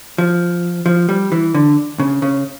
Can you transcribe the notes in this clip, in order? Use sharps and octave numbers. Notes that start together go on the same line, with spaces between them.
F3
F3
G3
E3
D3
C#3
C#3